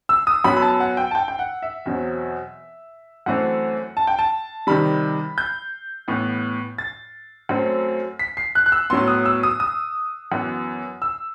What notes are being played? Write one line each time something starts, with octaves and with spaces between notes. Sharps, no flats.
E6
D#6
F#2 F#3 B3 B5
B5
A5
F#5
G5
A5
G5
G5
F#5
E5
E2 B2 F#3 C4
F#2 E3 A3 C4 F#5
A5
G5
A5
C3 D#3 G3 B5
G6
A2 E3 B3
A6
F#2 F#3 A3 C4
B6
C7
F#6
F#6
E6
A2 F#3 B3 C6
D#6
E6
D#6
D#6
F#2 E3 B3
E6